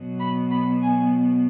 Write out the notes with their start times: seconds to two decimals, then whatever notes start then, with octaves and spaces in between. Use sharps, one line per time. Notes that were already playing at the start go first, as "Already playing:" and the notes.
Already playing: B2 F#3 B3
0.19 B5
0.50 B5
0.81 G#5